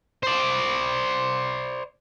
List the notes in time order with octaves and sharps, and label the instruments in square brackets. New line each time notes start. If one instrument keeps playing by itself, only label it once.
[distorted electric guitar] C5 D5